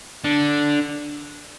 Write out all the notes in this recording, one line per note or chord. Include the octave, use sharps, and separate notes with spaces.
D3